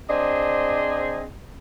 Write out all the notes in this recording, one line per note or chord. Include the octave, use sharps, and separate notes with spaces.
C4 D4 G#4 C5 D#5